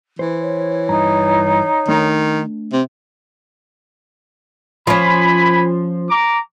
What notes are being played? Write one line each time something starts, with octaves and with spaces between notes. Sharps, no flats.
E3 C5
C#5
G2 D#4 A#5
D#3 A3 D4
C3
F3 C#4 G#5 B5
A#5 D6